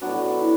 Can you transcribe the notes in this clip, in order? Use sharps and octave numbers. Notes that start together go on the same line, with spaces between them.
A2 F#3 B3 D4 F#4
E4